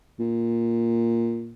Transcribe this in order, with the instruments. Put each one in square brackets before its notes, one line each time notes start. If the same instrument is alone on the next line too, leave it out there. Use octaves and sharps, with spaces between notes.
[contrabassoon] A#2